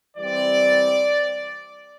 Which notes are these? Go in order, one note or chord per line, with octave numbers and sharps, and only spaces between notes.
E3 G3 C4 D5